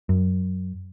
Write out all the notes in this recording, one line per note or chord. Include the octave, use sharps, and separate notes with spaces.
F#2